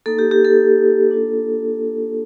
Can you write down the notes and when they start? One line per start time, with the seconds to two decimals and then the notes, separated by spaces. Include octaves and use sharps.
0.06 A#3 D#4 A4
0.19 G4
0.31 G4
0.45 A4
1.09 A#3 D4 F4